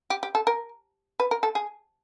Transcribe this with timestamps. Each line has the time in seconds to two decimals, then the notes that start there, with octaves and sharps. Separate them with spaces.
0.10 G4
0.23 G4
0.35 A4
0.47 A#4
1.20 B4
1.31 A#4
1.43 A4
1.55 G#4